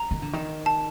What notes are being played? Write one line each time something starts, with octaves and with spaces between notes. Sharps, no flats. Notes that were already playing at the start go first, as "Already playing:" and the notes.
Already playing: A#5
D#3
D3
D#3
A5